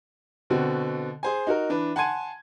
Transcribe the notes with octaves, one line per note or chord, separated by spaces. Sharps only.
B2 D3 C4 F#4
G#4 C5 G#5
D#4 F#4 A#4
E3 D4 B4
F#5 G#5 A5 C6 G#6 D#7